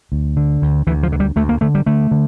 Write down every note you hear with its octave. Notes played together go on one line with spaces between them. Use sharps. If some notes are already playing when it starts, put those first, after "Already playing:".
D2
D3
D2
D2 E3
F3
D3
G3
D2 A3
A#3
D3 A3
G3
D3 A3
D3